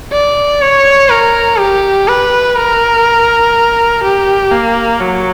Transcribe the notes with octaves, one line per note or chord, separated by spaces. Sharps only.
D5
C#5
A#4
G4
B4
A#4
G4
A#3
F#3